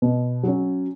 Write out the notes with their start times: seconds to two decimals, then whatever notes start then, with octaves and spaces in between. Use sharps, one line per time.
0.02 B2
0.43 F#3 C#4